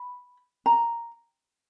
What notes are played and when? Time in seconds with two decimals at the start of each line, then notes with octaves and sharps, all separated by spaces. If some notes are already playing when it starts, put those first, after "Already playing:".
Already playing: B5
0.66 A#5